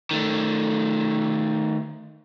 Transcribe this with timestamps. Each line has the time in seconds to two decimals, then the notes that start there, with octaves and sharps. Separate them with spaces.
0.11 D#3 A3